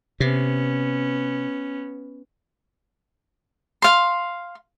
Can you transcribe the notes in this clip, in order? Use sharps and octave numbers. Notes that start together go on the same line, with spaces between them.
C3 B3 C#4
F5 C6